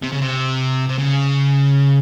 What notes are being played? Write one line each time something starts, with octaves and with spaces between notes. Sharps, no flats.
C3
C#3
C3
C3
C#3